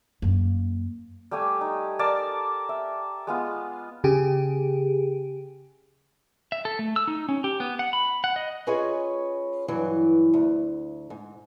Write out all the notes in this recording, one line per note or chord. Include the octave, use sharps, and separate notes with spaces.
F#2 A#3
G3 A3 G4 G#5
D#4
A4 A#4 D5 A5
E5
G#3 B3 F4
C#3 G4 G#4
E5
A4
A3
E6
D#4
C#4
G4
B3
F#5
B5
F#5
D#5
C#4 F4 G#4 B4 C#5 D#5
G2 E3 F#3
D2
G#2